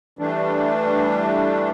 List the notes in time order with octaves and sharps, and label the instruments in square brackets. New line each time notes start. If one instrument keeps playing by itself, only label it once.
[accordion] E3 G3 A3 D4